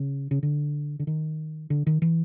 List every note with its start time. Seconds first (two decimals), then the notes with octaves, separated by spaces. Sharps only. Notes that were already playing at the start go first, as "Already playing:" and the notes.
Already playing: C#3
0.31 C#3
0.43 D3
0.99 D3
1.07 D#3
1.70 D3
1.87 D#3
2.02 E3